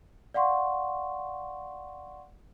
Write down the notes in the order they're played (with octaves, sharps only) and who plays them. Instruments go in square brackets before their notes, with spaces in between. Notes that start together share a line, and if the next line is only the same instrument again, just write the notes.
[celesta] D5 F5 F#5 C6 C#6